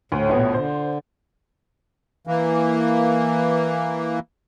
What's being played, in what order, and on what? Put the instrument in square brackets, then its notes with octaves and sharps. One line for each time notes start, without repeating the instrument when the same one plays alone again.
[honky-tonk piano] D2 [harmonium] A2
[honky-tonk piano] A#1 B2 B3
[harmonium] D3 [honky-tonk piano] C5
[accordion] E3 A#3